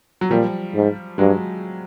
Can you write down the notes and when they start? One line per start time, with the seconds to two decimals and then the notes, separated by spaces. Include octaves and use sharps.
0.21 F#3
0.30 A#2 F3 G3
0.74 G#2
1.18 G2 F#3 G#3